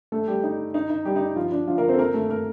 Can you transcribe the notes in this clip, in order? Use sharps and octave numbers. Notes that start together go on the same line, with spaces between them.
A3 A4
G3 G4
D#4
D#4
D#4
G3 G4
D#4
F3 F4
D4
F3 F4
A#3 A#4
C4 C5
A4
A#3 A#4
A3 A4
A#3 A#4